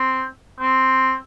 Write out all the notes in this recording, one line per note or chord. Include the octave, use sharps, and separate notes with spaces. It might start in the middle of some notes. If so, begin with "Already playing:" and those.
Already playing: C4
C4